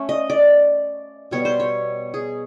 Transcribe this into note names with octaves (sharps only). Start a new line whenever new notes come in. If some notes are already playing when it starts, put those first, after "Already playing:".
Already playing: A3 C#4
D#5
D5
B2 G3 B3 C#5
C5
C#5
G#4